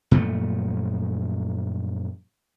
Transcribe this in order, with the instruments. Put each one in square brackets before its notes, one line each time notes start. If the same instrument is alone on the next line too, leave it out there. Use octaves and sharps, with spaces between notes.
[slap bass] F#2 A#2 F3 A3